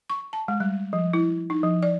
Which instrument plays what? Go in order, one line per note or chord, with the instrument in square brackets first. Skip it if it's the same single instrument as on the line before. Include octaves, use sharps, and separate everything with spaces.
[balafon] C#6
A5
G#3
G3
F3
E4
D#4
F3
D5